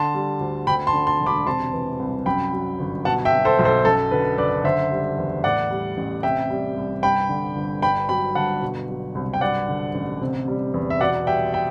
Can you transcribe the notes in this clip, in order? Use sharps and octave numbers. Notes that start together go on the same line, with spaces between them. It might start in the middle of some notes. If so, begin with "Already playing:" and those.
Already playing: D3 A5 C6
G3
D2
D2 G5 B5
A5 C6
D3
A5 C6
E1
B5 D6
C3 A5 C6
E3
C2
F#2 G5 B5
F#3
G1
B2 F#5 A5
E5 G5
F#3
A4 C5
B1
A4 C5
F#2 A4
D3 B4
F#1 B4 D5
D3 C5 E5
G3
E2
A2 D5 F#5
G3
A1
C3 E5 G5
G3
C2
G2 G5 B5
D3
G1
G2 G5 B5
F#3 G5 B5
G1 F#5 A5
B2
F#3
C2
G5
G2 D5 F#5
D3
A1
C3
G3
E2
E5
B2 D5 F#5
G3 E5 G5
E5 G5